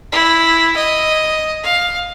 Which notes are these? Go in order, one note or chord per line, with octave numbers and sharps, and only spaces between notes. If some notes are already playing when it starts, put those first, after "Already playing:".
E4
D#5
F5